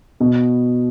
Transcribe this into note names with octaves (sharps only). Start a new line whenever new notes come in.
B2